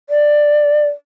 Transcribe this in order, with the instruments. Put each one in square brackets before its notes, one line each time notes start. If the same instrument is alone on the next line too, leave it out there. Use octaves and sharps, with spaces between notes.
[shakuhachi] D5